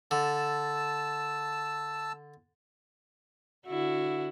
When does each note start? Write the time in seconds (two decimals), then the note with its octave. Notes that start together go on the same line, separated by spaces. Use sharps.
0.11 D3 A5 E6
3.67 D3 E4 F#4